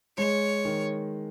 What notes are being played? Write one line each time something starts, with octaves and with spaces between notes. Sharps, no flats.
G#3 C#5
D#3